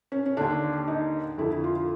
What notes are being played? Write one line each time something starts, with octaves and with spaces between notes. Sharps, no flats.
C#4
C#4
D#2 D3 D4
D#4
F2 D3 E4
E4
F4
F4